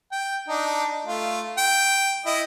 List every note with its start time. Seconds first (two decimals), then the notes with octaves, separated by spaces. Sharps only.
0.12 G5
0.48 D4 D#4
1.05 A3 F4
1.58 G5
2.26 E4 D#5